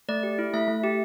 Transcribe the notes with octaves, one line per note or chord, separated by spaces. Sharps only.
A3 D5
G4
E4
A3 E5
A3
G4